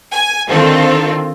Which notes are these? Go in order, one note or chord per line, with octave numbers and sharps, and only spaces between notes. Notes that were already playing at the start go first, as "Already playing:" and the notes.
G#5
D3 D#3 C4 F4 A4